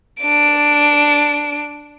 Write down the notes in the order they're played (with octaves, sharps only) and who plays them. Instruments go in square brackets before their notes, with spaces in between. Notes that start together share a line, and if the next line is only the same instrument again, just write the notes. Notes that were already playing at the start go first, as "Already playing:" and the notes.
[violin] D4 D7